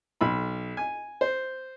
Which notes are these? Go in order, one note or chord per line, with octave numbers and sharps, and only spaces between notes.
B1 B5
G#5
C5